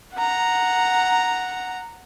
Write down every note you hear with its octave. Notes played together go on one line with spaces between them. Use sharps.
F#5 A#5